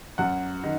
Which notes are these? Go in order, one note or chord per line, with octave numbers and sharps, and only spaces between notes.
F#2 F#5
D#3